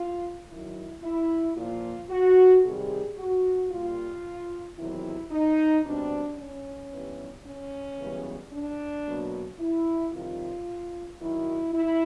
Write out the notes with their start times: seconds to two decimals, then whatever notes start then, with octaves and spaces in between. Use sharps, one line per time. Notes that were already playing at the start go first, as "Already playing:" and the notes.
Already playing: F4
0.49 F#2 D#3 F#3 E4
1.03 E4
1.56 A#2 F3 A#3 F4
2.10 F#4
2.63 C3 D#3 G3 G#4
3.18 F#4
3.71 A#2 G3 A#3 F4
4.78 E2 C3 D#3 F#3 E4
5.31 D#4
5.85 B2 G3 C4 D4
6.38 C#4
6.92 G2 E3 G3 B3
7.46 C#4
7.99 F#2 C#3 E3 G3 B3
8.53 D4
9.07 B2 F#3 A#3
9.59 E4
10.13 F2 C3 D#3 G3 F4
11.20 F#2 D#3 F#3 E4
11.74 E4